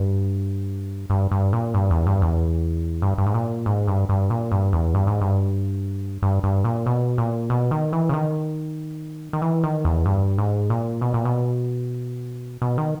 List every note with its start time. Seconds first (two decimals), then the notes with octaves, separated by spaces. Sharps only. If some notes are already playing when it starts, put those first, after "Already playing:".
Already playing: G2
1.10 G2
1.31 G2
1.53 A#2
1.74 G2
1.90 E2
2.07 G2
2.22 E2
3.02 G2
3.18 G2
3.26 G#2
3.34 A#2
3.66 G#2
3.88 G2
4.09 G2
4.30 A#2
4.52 G2
4.73 E2
4.94 G2
5.07 G#2
5.21 G2
6.22 G2
6.43 G2
6.64 A#2
6.86 B2
7.18 A#2
7.50 B2
7.71 D#3
7.93 E3
8.09 C#3
8.14 D#3
9.33 D#3
9.42 E3
9.64 D#3
9.85 E2
10.06 G2
10.38 G#2
10.70 A#2
11.01 B2
11.14 A#2
11.25 B2
12.62 B2
12.78 D#3